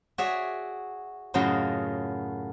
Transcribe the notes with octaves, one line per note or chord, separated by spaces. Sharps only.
F#4 G#4 C#5 D5 E5
F#2 A2 C#3 F#3 F4 D#5